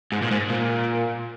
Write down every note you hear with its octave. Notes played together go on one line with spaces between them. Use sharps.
G#2
A#2
G#2
A#2